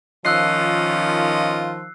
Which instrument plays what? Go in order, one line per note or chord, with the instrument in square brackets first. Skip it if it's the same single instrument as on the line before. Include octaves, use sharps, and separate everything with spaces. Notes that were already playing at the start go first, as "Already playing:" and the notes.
[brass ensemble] D#3 F3 [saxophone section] C#4 F4 D#5 [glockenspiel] E6 F#6 C7